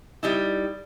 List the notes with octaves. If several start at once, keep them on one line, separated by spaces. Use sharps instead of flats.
G3 D#4 E4